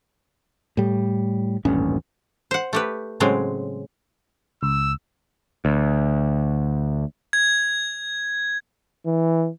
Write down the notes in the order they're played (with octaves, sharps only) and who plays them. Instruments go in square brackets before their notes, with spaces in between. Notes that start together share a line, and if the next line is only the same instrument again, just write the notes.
[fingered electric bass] A2 G3
D#1 A1 G2 C#4
[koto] C5 F#5
A3 G4 B4
A2 C#3 F#3 G#3 C4
[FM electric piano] C#2 [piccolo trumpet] E6
[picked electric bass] D2
[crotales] G#6
[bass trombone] E3